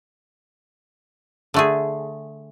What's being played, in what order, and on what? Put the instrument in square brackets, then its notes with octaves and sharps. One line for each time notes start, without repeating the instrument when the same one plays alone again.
[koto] D3 A3 G#4